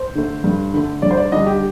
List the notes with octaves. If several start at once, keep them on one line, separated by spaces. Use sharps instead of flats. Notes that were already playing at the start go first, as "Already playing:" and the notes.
Already playing: C5
D3 A3
G2
D3 A3
G2 D5
C5
D5
D3 G3 D4 D#5
G4